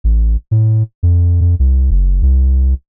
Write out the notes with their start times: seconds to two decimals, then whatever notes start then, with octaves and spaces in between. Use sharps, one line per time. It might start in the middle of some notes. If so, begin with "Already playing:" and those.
0.04 A1
0.51 A2
1.03 F2
1.41 F2
1.59 C2
1.91 F#1
2.22 C2